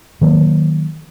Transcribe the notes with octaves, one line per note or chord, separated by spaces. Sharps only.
D#3 F#3 A#3